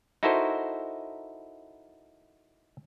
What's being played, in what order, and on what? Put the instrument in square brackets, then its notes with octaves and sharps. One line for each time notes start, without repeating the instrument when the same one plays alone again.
[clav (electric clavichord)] D#4 E4 F#4 A4 A#4 C5